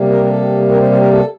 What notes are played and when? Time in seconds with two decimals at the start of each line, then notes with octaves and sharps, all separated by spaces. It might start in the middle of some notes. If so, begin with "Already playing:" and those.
Already playing: C3 G3 A#3
0.09 A#4
0.24 A#4
0.30 A4
0.70 A#4
0.81 C5
0.91 C5
1.01 A#4
1.11 A4